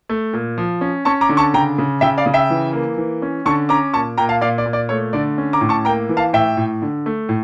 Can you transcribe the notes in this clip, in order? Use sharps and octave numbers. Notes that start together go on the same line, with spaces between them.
A3
A#2
F3
C#4
C#4 A5 C#6
A#5 D6
D3
A5 C#6
C#3 G5 A#5
C#3
C#3 E5 G5
D5 F5
C#3
E5 G5
E3
A#3
E3
C#4
D3 A5 C#6
C#4 A#5 D6
A#2 A5 C#6
A#2 G5 A#5
F5 A5
A#2 D5 F5
D5
A#2
D5
A3 C#5
D3 D5
C#4
A#5 D6
A2
A5 C#6
A#3 G5 A#5
E3
F5 A5
A2 E5 G5
A2
D3
A3
A2